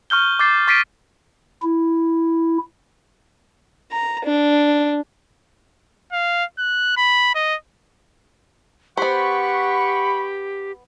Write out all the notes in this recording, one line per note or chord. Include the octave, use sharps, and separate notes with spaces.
C#6 F6 G6 G7
D6 G6 A6 C7
C#6 A6 B6 C7 D7 D#7
E4
A#5
D4
F5
F#6
B5
D#5
B3 G4 C5 F#5 B5 C#6